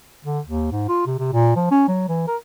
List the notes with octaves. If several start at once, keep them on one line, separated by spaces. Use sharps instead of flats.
D3
D#2
G#2
F4
C3
C3
A#2
F3
C#4
F#3
E3
A#4